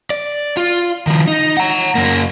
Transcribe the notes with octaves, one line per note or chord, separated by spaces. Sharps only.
D5
F4
D#3 F3
D#4
F#5 A#5
F#2 A#3